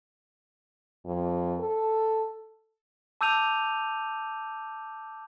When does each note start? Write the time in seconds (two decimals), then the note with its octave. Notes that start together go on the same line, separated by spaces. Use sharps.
1.06 F2
1.60 A4
3.21 A5 D6 E6 G6 D#7 F7